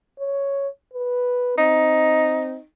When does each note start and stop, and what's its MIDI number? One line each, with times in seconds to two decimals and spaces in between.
0.20 0.68 73
0.94 1.56 71
1.58 2.57 60
1.58 2.65 63